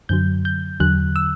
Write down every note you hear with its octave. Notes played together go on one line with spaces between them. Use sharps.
F#2 D3 F#3 G6
G6
E2 D3 F#3 F#6
E6